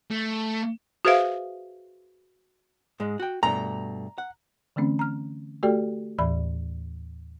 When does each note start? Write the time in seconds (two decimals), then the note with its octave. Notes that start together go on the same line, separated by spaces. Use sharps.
0.11 A3
1.05 F#4 G#4 B4 C5 E5 F5
3.00 G#2 G#3
3.20 F#4 G5
3.43 G2 B2 A3 A#5
4.18 F#5
4.76 D3 E3 A3 C4 C#4
4.99 A#5 F6
5.63 A3 F#4 G4 A4 D5 G5
6.18 D#2 A2 E3 D5 B5